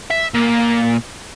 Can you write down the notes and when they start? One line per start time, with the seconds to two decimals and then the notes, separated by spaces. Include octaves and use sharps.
0.11 E5
0.34 A#2